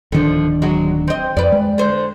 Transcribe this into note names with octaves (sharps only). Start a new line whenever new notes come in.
D1 D3 D#3 F3 D4
F#3 G#3 F#4
C4 D#5
F2 B4 D5
G#3
D3 C5